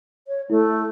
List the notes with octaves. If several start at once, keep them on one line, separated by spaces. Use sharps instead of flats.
C#5
A3 E4 A4